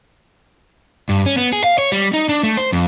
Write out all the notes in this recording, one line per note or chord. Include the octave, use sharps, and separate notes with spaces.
G2
C#4
B3
G#4
F5
C#5
G3
D#4
D4
A3
C5
F2